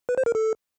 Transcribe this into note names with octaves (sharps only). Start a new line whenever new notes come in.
B4
C5
A#4
A4